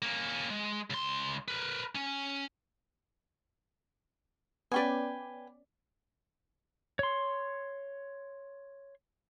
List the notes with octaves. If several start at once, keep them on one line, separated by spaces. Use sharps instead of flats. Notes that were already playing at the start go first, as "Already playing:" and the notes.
A#3 C#4
G#3
C#2 C6
A#4 B4
C#4
B3 C#4 B4 D5 G5 G#5
C#5 C6